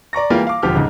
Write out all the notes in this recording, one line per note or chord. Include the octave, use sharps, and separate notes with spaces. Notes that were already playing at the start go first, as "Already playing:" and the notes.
D5 A#5 C#6 A#6
E3 G3 G#3 A#3 F4 G4
F5 D6
E1 D3 F3 G4 F6
C#2 G#2 C#3